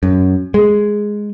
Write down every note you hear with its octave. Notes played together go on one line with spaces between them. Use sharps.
F#2
G#3